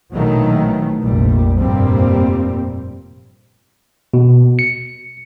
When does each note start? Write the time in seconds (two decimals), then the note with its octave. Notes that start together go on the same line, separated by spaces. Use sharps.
0.13 A#1 B2 D#3 E3 F#3 A3
1.03 F1 A#1 G3
1.59 F1 G2 A#2 G3 A#3 C4
4.14 B2
4.59 C#7